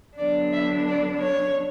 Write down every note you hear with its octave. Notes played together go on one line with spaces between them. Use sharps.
D3 F#3 B3 D4 D5
E5
D5
C#5